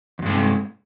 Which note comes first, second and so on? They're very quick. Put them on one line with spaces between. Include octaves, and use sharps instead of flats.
E2 G2 G#3 C3